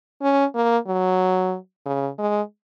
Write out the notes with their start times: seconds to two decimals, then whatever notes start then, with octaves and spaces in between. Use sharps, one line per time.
0.22 C#4
0.55 A#3
0.87 F#3
1.86 C#3
2.18 G#3